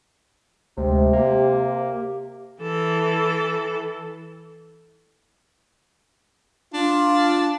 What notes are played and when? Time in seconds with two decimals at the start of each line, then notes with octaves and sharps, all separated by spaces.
0.78 D2 C3 G#3
1.13 A#3 G4
2.62 E3 A4
6.74 D4 F4